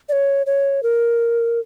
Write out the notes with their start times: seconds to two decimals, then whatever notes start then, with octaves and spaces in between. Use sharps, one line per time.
0.09 D5
0.12 C#5
0.46 C#5
0.83 A#4